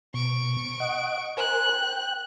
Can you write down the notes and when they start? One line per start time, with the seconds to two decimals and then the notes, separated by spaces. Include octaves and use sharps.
0.14 B2 C#6 D7
0.80 D#5 F#5
1.37 A#4 C5 G#5 F#6
1.73 G5